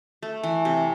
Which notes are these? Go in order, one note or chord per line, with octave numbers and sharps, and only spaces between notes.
A3
E3
C3